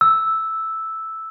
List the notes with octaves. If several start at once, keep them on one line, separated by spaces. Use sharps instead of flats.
E6